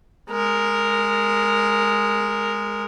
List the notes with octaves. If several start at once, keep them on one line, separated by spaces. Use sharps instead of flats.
G#3 A#4